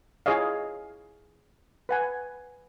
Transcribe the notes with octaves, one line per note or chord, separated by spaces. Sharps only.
E4 F4 G#4 C#5 D#5 F5
B4 F#5 G#5